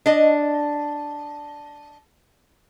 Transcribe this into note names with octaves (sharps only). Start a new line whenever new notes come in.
D4 D#5